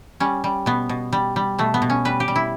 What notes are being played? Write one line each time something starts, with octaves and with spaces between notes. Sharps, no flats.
G3 C#4
G3
B2 B3
B2
G3
G3
B2 A3
B3
B2
C#4
G3 B4
G4
G3
E4